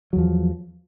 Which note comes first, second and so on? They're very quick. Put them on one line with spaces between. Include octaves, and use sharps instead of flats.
F#3 E2 F3